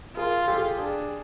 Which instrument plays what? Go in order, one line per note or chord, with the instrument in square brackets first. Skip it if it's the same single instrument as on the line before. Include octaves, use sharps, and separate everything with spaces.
[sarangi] F4 [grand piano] G#4 A#4
[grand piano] G4 A4
G#4
G4
[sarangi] D4 [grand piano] G#4